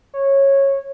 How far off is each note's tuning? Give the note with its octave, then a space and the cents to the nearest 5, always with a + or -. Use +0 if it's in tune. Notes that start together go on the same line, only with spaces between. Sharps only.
C#5 -15